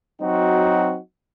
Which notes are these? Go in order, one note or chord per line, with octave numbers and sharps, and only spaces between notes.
F#3 C4 D#4 F#4